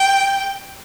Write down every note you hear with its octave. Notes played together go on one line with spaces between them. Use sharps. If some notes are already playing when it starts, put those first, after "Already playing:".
Already playing: G5